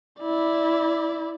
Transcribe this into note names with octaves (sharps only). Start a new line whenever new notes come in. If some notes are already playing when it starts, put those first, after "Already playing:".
E4 D5